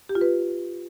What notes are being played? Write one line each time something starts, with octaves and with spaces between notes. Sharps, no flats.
G4
F4
B4